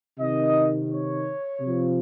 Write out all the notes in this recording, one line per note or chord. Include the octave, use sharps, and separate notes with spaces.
C3 D#3 D#5
C#5
C3 F3